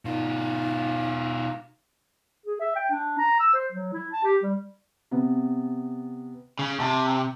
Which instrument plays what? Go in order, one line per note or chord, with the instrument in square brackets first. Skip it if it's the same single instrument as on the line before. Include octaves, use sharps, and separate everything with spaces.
[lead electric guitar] B2 F4 [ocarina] D#4
[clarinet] G#4
E5
G5
D4
A#5
E6
C5
F#3
E4
A5
G4
G3
[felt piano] C3 B3
[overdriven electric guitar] C#3
[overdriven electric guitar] C3 [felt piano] G5 A5